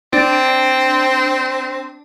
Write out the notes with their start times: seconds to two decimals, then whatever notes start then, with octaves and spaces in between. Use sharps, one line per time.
0.13 C4 D4